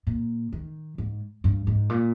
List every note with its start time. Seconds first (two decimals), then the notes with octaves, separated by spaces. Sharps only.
0.07 A#2
0.53 D#3
0.98 G#2
1.44 G2
1.67 G#2
1.90 A#2